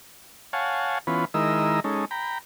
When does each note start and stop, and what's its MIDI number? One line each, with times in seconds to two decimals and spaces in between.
0.53 0.98 73
0.53 0.98 77
0.53 0.98 78
0.53 0.98 80
0.53 0.98 81
1.07 1.25 52
1.07 1.25 59
1.07 1.25 61
1.07 1.25 65
1.07 1.25 71
1.34 1.80 51
1.34 1.80 56
1.34 1.80 64
1.34 1.80 70
1.34 1.80 75
1.34 1.80 88
1.84 2.05 56
1.84 2.05 61
1.84 2.05 63
1.84 2.05 69
2.11 2.38 79
2.11 2.38 82
2.11 2.38 83